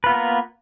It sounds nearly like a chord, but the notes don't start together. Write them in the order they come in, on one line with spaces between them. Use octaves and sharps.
B4 F4 B3 A#3 A#4